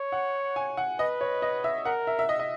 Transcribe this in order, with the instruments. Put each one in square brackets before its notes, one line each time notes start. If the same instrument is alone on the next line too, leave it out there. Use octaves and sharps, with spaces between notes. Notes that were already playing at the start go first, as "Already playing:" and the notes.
Already playing: [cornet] C#5
[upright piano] F#5
G#5
F#5
[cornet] B4 [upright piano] D#5
[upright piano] C#5
D#5
E5
[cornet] A#4 [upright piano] F#5
[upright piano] E5
E5
D#5
D#5